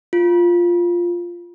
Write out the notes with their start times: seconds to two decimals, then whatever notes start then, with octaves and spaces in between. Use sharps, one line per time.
0.13 F4